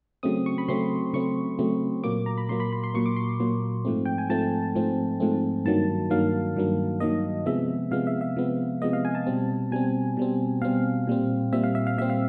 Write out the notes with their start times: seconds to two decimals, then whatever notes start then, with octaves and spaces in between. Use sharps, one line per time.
0.23 C#3 F#3 A3 C4 D#6
0.46 C#6
0.58 B5
0.68 C#3 F#3 A3 C4 C6
1.13 C#3 F#3 A3 C4 C#6
1.59 C#3 F#3 A3 C4
2.04 A#2 F#3 A#3 D6
2.26 A#5
2.38 B5
2.49 A#2 F#3 A#3 C6
2.60 B5
2.72 B5
2.83 C6
2.94 A#2 F#3 A#3 C#6
3.06 D6
3.16 C6
3.40 A#2 F#3 A#3
3.85 G#2 F3 A3 C4
4.05 G5
4.18 G#5
4.30 G#2 F3 A3 C4 A5
4.75 G#2 F3 A3 C4
5.20 G#2 F3 A3 C4
5.65 G2 D#3 F#3 A#3 A5
6.10 G2 D#3 F#3 A#3 F5
6.56 G2 D#3 F#3 A#3
7.00 G2 D#3 F#3 A#3 D#5
7.46 C3 F3 G#3 B3 E5
7.91 C3 F3 G#3 B3 F5
8.07 E5
8.21 E5
8.36 C3 F3 G#3 B3
8.82 C3 F3 G#3 B3 D#5
8.93 F5
9.05 G#5
9.15 A5
9.26 B2 G3 C4
9.71 B2 G3 C4 G#5
10.17 B2 G3 C4
10.62 B2 G3 C4 F5
11.07 A#2 G3 C4
11.53 A#2 G3 C4 E5
11.64 F5
11.75 E5
11.87 F5
11.97 A#2 G3 C4 E5
12.10 F5